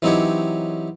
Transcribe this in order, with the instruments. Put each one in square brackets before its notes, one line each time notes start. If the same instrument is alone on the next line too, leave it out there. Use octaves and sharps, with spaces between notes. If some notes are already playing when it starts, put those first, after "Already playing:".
[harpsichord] E3 F#3 C4 D#4 G4 C#5